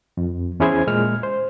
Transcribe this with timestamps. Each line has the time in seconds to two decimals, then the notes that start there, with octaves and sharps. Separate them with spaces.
0.17 F2
0.60 E2 C#4 E4 G#4 C5 G#6
0.87 A#2 G#3 F6
1.23 C5